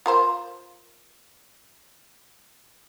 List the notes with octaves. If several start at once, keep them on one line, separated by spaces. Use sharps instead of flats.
F4 A#4 C5